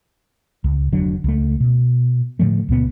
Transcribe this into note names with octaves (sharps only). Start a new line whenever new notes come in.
C#2
F1 D3 F#3 D4
C#2 A3
B2
A2 D3 F3 A3
C#2 A#2 B3